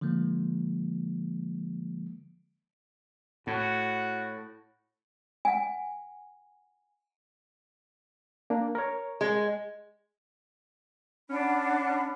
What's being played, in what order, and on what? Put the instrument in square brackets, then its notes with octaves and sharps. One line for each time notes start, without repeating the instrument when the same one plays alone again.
[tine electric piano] D3 F3 G#3 A#3
[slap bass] A2 [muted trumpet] F#4
[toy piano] F#5 G#5
[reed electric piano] A#3 D4
A#4 C#5
[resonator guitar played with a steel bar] G#3
[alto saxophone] C#4 [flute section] D4 F#5 B5